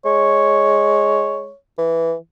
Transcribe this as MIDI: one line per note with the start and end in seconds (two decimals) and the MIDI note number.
0.05 1.49 56
0.05 1.55 73
1.78 2.14 52